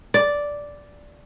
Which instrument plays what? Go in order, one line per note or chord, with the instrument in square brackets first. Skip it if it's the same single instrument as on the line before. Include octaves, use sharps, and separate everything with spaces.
[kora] D5